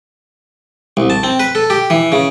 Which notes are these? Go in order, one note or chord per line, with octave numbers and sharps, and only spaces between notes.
C2
A5
C4
B4
A4
G4
E3
C#3